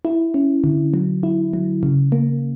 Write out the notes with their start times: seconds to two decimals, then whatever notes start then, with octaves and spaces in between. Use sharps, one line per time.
0.05 E4
0.34 C#4
0.64 D3
0.94 F#3
1.23 E4
1.53 F#3
1.83 C#3
2.12 A#3